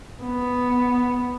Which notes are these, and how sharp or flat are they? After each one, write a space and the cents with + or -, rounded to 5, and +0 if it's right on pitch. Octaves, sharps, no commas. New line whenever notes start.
B3 +0